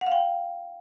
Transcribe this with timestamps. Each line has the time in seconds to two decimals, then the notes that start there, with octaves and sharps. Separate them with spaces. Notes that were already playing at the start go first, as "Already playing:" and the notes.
0.01 F#5
0.06 F5
0.12 G5